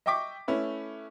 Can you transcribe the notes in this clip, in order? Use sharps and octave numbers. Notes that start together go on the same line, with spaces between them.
D#5 E5 G5 C#6 D6 B6
A3 C#4 E4 B4